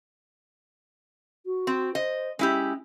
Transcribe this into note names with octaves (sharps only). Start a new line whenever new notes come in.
F#4
C4
C5 D#5
G#3 C#4 E4 G4